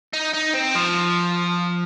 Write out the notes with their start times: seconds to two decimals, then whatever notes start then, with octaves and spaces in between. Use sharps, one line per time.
0.14 D#4
0.34 D#4
0.55 C4
0.75 F3